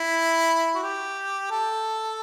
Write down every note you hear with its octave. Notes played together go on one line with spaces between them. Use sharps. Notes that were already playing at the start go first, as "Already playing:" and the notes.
Already playing: E4
F#4
G4
A4